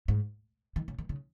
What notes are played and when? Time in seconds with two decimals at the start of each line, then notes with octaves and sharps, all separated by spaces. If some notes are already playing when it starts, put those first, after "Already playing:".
0.08 G#2
0.76 D#3
0.88 C#3
0.99 D#3
1.09 C#3